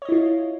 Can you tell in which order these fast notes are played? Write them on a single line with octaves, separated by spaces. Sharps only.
C#5 D#5 E4 F4